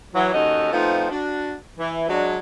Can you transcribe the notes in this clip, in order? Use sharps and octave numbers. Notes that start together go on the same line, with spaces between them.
E3 F#3
D#2 C#4 D#4 F#4 A4 D#5
F3 A3 B3 C4 D#4 F4
D4 F#4
E3
F#3 G#3 D4